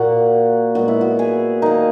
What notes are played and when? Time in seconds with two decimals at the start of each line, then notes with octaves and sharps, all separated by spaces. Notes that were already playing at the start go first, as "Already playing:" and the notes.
Already playing: A#2 A#3 F#4
0.75 A#2 G#3 B3 F#4
0.88 E4
1.01 F#4
1.19 G#4
1.62 D#3 A#3 D#4